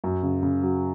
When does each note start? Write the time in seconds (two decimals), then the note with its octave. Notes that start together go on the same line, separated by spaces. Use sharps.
0.04 F#2
0.23 C#3
0.43 C#3
0.63 F#3